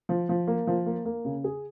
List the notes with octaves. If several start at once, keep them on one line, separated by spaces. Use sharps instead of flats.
F3
F3
A#3
F3
A#3
A#3
C#3
G#4